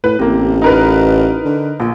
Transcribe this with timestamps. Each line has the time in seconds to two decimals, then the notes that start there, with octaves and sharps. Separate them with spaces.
0.04 A2 B4
0.19 A1 C3 A#3
0.62 D#4 A#4 B4
1.45 D3
1.80 A#1 A#2